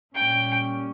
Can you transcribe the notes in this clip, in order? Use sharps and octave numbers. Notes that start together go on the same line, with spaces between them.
A#2 G3 C#4 G5